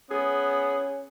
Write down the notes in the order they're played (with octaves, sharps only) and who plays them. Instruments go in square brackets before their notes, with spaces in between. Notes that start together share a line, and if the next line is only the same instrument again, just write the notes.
[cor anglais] B3 [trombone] C#4 [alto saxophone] G#4